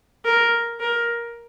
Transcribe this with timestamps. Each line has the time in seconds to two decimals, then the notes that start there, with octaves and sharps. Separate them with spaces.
0.25 A#4
0.80 A#4